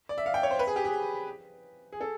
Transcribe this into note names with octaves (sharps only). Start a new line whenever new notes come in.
D5
E5
F5
G5
C#5
C5
B4
G#4
G4
G#4
G#4
A4